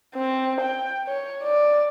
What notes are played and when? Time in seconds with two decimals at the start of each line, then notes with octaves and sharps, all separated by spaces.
0.15 C4
0.61 G5
1.07 C#5
1.43 D5